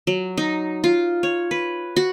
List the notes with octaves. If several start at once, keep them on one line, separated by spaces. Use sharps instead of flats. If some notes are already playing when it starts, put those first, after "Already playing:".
F#3
D#4
F4
C#5
B4
F#4